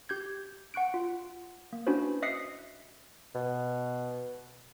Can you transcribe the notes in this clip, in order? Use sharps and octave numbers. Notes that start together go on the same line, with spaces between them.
G4 G6 G#6
F#5 C#6 F#6 D7
F4
A#3
C#4 D4 E4 F#4 B4 C5
D#5 E5 D#6 F#6 C7 C#7
B2